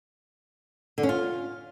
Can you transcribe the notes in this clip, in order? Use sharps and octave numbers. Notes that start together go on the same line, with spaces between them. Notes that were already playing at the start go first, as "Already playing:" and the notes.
D3
C#4
F4